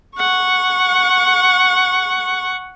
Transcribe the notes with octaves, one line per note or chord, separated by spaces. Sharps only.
F#5 C#6